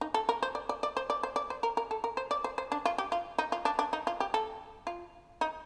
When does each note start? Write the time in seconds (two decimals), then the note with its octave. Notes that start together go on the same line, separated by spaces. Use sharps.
0.01 D#4
0.14 A4
0.29 A#4
0.43 C5
0.55 D5
0.69 D5
0.83 D5
0.97 C5
1.10 D5
1.23 C5
1.36 D5
1.50 C5
1.63 A#4
1.77 A#4
1.91 A4
2.04 A#4
2.17 C5
2.31 D5
2.44 C5
2.58 C5
2.72 D4
2.86 F4
2.98 G4
3.12 F4
3.38 D#4
3.52 F4
3.65 D4
3.79 D4
3.93 D#4
4.07 F4
4.20 G4
4.34 A4
4.87 F4
5.41 D#4